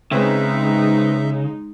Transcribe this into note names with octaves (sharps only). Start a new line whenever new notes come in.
C#3 G#3 C4 D#4 B4 E5